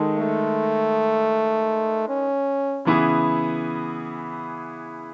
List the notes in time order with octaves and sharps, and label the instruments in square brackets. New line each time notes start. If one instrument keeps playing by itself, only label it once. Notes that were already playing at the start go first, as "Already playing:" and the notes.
Already playing: [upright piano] D#3 G#3 D#4 A4
[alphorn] A3
C#4
[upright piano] C#3 E3 B3 E4 G#4